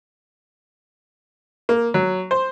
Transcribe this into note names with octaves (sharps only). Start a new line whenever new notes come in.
A#3
F#3
C5